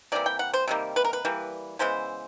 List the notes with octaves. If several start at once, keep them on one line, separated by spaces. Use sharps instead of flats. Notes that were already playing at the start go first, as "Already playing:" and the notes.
C3 E3 G3 A#3 D5
G5
F#5
C5
C3 D#3 G3 A#3
B4
A#4
B4
E3 G3 A#3
C#3 E3 G#3 B3 C5